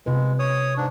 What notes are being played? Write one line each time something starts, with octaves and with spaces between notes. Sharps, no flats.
C3 G#3 F4 B4
C#5 D#6
G#2 D4